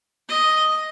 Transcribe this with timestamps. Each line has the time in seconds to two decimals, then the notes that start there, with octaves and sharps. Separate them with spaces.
0.29 D#5